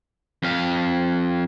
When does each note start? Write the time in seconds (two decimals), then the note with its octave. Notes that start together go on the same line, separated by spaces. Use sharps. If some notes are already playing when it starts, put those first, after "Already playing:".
0.43 F2 F5